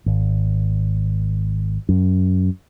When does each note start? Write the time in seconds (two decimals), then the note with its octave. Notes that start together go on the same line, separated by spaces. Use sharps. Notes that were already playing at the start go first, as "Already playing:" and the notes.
0.06 G#1
1.89 F#2